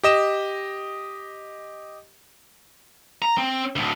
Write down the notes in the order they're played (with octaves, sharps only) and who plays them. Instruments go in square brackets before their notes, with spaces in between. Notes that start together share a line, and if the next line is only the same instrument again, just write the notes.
[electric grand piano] G4 D#5 E7
[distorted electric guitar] A#5
C4
D2 A2